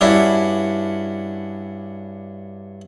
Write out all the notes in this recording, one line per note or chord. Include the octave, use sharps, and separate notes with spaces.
G2 C#4 D4 E4 F#4